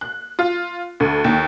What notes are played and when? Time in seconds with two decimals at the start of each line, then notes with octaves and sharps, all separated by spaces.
0.01 F#6
0.39 F4
1.00 D2
1.24 D#2